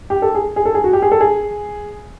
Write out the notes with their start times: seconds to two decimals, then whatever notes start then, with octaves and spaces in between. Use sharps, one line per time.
0.10 G4
0.22 A4
0.35 G#4
0.56 G#4
0.65 A4
0.75 G#4
0.84 F#4
0.93 G4
1.02 G#4
1.12 A4
1.21 G#4